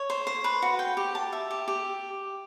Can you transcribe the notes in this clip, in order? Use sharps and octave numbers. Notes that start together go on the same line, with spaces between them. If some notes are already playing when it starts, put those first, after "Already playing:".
Already playing: C#5
C5
C5
B4
F#4
G5
G4
A5
E5
G4
G4